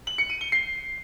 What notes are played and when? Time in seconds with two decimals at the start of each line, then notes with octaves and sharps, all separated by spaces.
0.07 F#7
0.18 C#7
0.30 D#7
0.41 G7
0.52 C7